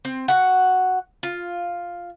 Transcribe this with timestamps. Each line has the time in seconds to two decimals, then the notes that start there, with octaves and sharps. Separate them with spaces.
0.05 C4
0.28 F#4 F#5
1.23 F4